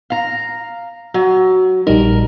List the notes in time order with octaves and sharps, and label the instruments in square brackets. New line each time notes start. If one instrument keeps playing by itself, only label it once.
[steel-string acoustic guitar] F5 A#5
F#3
[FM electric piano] A#1 G3 D#4 [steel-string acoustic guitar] A#4